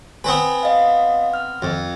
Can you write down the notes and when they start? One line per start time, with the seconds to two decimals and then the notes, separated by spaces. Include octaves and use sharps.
0.24 B3 C4 B4 G#5
0.63 D#5 F5
1.34 F6
1.62 F2